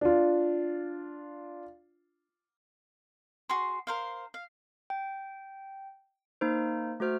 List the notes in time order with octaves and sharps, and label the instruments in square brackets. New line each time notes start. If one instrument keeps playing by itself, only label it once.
[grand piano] D4 F4
[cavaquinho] F#4 G#4 C6
A#4 C5 F5
F5
[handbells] G5
A#3 D#4 C5
A3 F#4 C5 F6